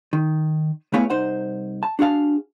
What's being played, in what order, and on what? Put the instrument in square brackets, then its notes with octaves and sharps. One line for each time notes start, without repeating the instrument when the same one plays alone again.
[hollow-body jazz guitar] D#3
A3 B3 E4 G#4 C#5 F5
C2 D#4 C5 F#5
A5
D4 F#4 G#4 F5 A5